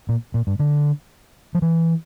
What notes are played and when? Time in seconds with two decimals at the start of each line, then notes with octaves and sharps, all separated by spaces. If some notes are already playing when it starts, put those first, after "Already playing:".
0.09 A#2
0.34 A#2
0.47 G2
0.59 D3
1.55 F3
1.62 E3